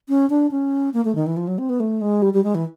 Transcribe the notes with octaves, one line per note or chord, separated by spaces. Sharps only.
C#4
D4
C#4
A#3
A3
D#3
E3
F3
F#3
C4
B3
A3
G#3
G3
G3
G#3
E3